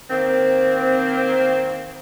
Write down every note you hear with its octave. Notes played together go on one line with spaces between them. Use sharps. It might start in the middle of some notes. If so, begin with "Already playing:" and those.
D#3 A#3 C4